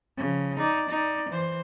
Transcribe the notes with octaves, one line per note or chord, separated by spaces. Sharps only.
C#3 F3
D#4 D5
D#4 D5
E3 C5